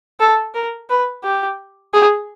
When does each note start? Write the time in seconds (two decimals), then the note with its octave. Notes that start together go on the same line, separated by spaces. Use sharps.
0.20 A4
0.55 A#4
0.90 B4
1.24 G4
1.94 G#4